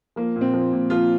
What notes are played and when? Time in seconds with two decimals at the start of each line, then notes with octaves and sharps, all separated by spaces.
0.16 F3 A#3
0.36 A#2
0.41 C4
0.54 F3
0.72 A#2
0.90 F3 F4